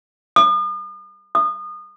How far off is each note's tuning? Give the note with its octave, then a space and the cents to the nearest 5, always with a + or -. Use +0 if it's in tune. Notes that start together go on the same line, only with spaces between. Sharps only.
D#6 -45
D#6 -30